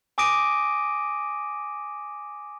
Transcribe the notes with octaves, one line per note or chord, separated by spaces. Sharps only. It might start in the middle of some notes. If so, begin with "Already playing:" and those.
G#5 D6 D#6 A#6 D7 D#7